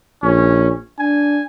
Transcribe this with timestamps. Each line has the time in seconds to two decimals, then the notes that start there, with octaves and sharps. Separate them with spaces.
0.23 A#1 C#4
0.99 D4 G#5